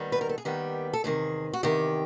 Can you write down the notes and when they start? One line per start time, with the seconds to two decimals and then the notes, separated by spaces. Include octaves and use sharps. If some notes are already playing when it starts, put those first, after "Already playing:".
Already playing: D#2 D#3 G3 B3
0.12 B4
0.21 A#4
0.29 A4
0.38 G#4
0.45 D#2 D#3 G3 B3 G4
0.93 A4
1.04 E2 C3 D#3 G#4
1.53 F#4
1.63 E2 C3 D#3 G4